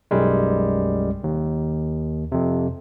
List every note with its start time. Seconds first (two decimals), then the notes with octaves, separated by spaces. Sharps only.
0.11 B1 F#2 G3 G#3
1.24 D#2
2.32 F2 C3